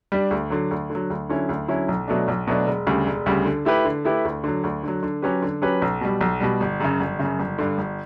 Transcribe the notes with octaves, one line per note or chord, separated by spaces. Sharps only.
G3 D4
D2
D3 F#3
D2
D3
F#3
D2
D3 F#3 C#4 E4
D2
D3 F#3 C#4 E4
B1
B2 F#3 A3 D4
B1
B2 F#3 A3 D4
E1
D2 C#3 G3
E1
D2 C#3 G3
D3
A3 E4 G4 B4
D3
A3 E4 G4 B4
D2
D3 F#3
D2
D3 F#3
D3
F#3 C#4 G4 B4
D3
F#3 C#4 G4 B4
B1
B2 G3
B1
B2 G3
G1
F#2 C#3
G1
F#2 C#3
G1
G2 D3
G1